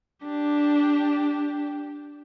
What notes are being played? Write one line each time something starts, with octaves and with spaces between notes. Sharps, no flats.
D4 G4